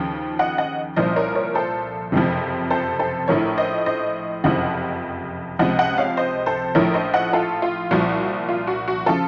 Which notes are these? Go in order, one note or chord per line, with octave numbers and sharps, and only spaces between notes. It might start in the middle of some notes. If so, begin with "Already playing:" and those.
Already playing: D#2 C#3 F3
D#5 F#5
D#5 F#5
C2 A#2 F3 C5 D#5
A#4 C#5
A#4 C#5
A4 C5
F#1 F2 C3 F3
A4 C5
A4 C5
A#1 A2 F3 A#4 C#5
C5 D#5
C5 D#5
F#1 F2 C3 F3 D#5 F#5
C#2 C3 F3 D#5 F#5
D#5 F#5
C#5 F5
C5 D#5
A4 C5
A#1 A2 F3 A#4 C#5
C5 D#5
D#5 F#5
F4 A4
F4
C2 A#2 F3 F#4
F4
F#4
F#4
C#3 F3 F4 A4